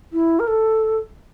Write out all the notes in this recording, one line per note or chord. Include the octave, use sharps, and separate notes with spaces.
E4
A#4
A4